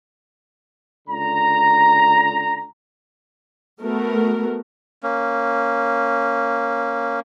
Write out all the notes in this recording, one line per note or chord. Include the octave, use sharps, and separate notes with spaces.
C#2 D3 A#5
A3 B3 F#4 A#4
A#3 C#4